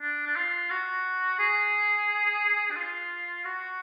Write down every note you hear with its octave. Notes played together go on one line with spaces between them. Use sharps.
D4
D4
F4
F#4
G#4
D4
F4
F#4